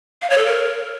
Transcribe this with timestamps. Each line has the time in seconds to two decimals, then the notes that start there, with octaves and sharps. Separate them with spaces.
0.22 F5
0.30 C#5
0.38 A4
0.46 A#4